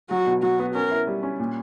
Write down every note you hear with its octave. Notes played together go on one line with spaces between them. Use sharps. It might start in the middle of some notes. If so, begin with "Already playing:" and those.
F#3 F#4
B2
F#3 F#4
B3
C#4 A#4
E4
G3
C#4
A#2